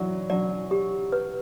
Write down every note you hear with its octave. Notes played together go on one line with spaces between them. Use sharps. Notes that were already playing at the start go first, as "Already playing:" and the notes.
Already playing: E3 F#3 D5
F#3 D5
G4
B4